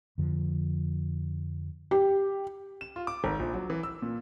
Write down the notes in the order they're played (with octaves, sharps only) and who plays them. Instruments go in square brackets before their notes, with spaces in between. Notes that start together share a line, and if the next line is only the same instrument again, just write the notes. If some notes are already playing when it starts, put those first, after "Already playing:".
[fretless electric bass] F2 D3 F3
[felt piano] G4
[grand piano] E7
F4
D6
G#1
A#1
F#3
E3
E6
A#2